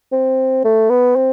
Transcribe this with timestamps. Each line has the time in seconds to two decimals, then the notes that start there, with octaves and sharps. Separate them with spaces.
0.12 C4
0.64 A3
0.89 B3
1.16 C4